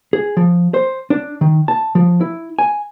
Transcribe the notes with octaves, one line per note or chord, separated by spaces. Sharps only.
G#4
F3
C5
D4
D#3
A5
F3
E4
G#5